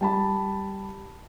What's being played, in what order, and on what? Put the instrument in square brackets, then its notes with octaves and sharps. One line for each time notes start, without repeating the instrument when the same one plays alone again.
[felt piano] G3 A5 B5